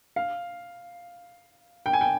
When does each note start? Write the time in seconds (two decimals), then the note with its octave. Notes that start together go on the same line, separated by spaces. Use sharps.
0.16 F5
1.86 G5
1.93 G#5
2.01 G5